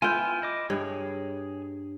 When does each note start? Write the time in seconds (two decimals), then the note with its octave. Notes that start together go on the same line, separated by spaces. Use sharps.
0.02 B3 E4 F4 G5 G#5
0.42 E4 D#5 D6
0.70 G2 G#4 C#5